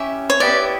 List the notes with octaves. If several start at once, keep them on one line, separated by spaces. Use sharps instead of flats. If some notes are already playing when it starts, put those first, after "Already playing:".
Already playing: C#4 E4 G4 E5
C#5
B3 E4 G4 B4 D5